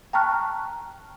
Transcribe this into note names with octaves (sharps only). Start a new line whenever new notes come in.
G5 A5 A#5 C#6 F6 F#6